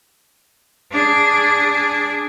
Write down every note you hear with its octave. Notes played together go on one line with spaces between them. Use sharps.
D4 G#4